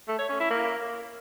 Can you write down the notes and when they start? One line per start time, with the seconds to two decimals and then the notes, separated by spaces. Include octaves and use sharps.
0.08 A3
0.19 C#5
0.29 C#4
0.40 E4
0.51 A#3